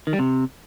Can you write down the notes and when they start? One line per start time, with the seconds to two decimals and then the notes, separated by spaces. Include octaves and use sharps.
0.07 D#3
0.13 G3
0.19 C3